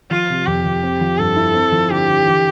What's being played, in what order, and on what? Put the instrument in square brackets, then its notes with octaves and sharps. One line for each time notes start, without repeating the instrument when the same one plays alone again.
[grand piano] F3 [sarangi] F4
[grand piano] C3
[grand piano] F2 [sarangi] G4
[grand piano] F2
C4
F3
[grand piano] G2 [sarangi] A4
[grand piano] E4
C4
F3
[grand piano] D3 [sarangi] G4
[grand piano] D3
E3